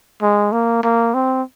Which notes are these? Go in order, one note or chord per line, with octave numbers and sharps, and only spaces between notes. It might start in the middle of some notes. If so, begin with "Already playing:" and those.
G#3
A#3
A#3
C4